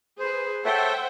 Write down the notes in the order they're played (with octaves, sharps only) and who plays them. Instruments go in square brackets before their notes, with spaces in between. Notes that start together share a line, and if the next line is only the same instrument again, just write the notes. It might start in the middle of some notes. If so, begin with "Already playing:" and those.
[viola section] G#4 B4 [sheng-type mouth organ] C5
[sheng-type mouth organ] A4 C#5 [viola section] C5 F#5 [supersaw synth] E5 G5